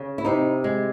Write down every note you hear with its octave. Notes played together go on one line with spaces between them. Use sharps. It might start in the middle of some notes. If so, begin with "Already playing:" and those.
Already playing: C#3
E4
C3 D#4
G#3